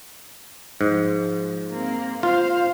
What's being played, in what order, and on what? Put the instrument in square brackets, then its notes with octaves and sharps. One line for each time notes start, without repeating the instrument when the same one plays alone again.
[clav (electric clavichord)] G#2 [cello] F3
[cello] A#3 C4
[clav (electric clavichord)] F4 [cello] C5 F5